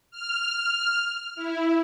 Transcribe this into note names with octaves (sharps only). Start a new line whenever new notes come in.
F6
E4